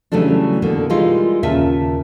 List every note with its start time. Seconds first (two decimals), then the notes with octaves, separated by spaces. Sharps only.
0.12 C#3 E3 F#3 G3 A3 D4
0.62 B2 D3 A#3
0.90 E3 G3 G#3 D#4 F4
1.43 D#2 A#2 C#3 F4 E5 A5